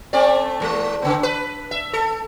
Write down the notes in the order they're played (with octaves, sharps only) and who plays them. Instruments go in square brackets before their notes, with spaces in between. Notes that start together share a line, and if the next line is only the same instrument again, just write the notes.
[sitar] A3 C4 D5
E2 G3 G#3
C#3 B3
B4
E5
A4